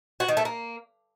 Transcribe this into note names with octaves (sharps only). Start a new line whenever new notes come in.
F#4
D#3
A3
A#3